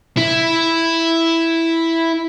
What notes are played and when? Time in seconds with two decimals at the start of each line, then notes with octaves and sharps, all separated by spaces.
0.17 E4